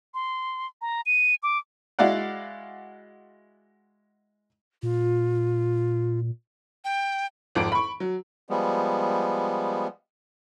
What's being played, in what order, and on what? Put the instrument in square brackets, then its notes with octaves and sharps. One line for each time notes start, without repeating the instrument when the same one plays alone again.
[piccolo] C6
A#5
D#7
D6
[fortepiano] G#3 E4 F#4 D5 F5 F#5
[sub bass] A#2 [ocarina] F4
[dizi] G5
[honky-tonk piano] G#1 F2 D6 D7
B5 C#6
F#3
[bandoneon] F3 G3 G#3 B3